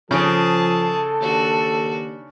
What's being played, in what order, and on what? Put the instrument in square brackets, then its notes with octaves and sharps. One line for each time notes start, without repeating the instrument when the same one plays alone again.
[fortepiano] C#3 [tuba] F3 [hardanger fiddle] G#4 A5 [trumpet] A4
[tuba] D#2 [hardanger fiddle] D4 F#4